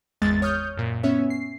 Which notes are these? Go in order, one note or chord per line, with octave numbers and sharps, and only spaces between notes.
G#1 E2 G#3 A6
C#5 D#6 F6 G6
F#2 A#2
B3 C#4 C#5 E5
C7